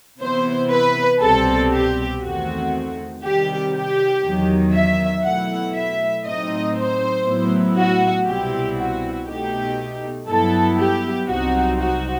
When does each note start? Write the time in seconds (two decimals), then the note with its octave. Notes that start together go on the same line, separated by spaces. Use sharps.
0.20 C3 E3 B3 E4 C5
0.71 B4
1.21 C2 B2 G3 C4 A4
1.72 G4
2.22 E2 D#3 A3 C4 F#4
3.23 C3 D#3 G3 G4
3.73 G4
4.23 E2 D#3 F#3
4.74 E5
5.24 B2 F#3 A3 E4 F#5
5.74 E5
6.25 A2 F#3 C4 D#4 D#5
6.75 C5
7.25 A2 F#3 B3 E4
7.76 F#4
8.26 C2 B2 G3 C4 E4 G4
8.77 F#4
9.27 B2 A3 D#4 G4
10.28 G2 F#3 B3 E4 A4
10.78 G4
11.28 C2 C3 F#3 C4 D#4 F#4
11.79 F#4